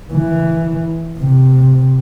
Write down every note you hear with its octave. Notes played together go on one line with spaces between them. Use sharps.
E3
C3